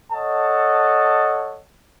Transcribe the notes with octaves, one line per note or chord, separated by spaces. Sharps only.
A4 C#5 D#5 F#5 A5